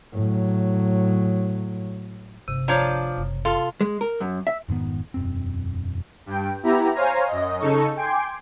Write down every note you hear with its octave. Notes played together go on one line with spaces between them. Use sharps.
A2 F#3
G1 C3
F3 D4 C#5 A#5
F#1
F4 A4
G#3
A#4
F#2
E5
F1 G#2 D#3 B3
E1 F#2 C4
G2 G5
B3 E4 G4 A#5
C5 C#5 F5 G#5 A#5
F#2 D#5
C#3 D#4 A4 C#6
G5 G#5 C6 D6